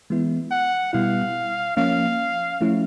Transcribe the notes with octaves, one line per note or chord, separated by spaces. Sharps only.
E3 G#3 B3 E4
F#5
B2 G3 B3 E4 F5
F3 A#3 C#4 F5
F3 A3 C#4 E4